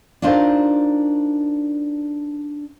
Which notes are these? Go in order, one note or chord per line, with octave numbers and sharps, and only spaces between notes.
D4 D#4 F4 A#4 C5